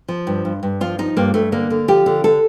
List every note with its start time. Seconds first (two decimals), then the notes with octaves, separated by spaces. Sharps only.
0.08 F3
0.27 G2
0.45 G2
0.63 G2
0.81 F3 F4
0.99 F3 D#4
1.17 G2 A#3
1.34 G2 A3
1.52 D3 A#3
1.70 D3
1.88 F3 G4
2.06 D3
2.24 D3 A4